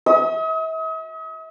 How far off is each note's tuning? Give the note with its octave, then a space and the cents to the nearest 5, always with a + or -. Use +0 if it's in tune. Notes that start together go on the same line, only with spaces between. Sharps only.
E5 -40 D#6 +40